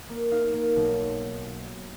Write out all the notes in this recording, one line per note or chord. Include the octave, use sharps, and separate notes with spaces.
A#3
D#4 F5
A#3
B1